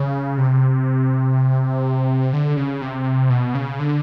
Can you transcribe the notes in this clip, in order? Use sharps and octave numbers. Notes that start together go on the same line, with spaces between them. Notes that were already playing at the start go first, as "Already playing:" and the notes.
Already playing: C#3
C3
D3
C#3
C3
B2
C#3
D3